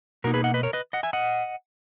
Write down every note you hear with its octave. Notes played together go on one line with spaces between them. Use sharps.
B2 A#3 D#4 F#4 A#4
G#4 B4
D#5 F#5
B4 D#5
A#4 C#5
B4 D#5
D#5 F#5
E5 G#5
D#5 F#5